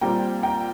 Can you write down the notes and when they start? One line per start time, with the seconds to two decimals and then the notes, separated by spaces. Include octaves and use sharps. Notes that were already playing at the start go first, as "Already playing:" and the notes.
0.01 A#2 G3 C4 G5 A#5
0.43 G5 A#5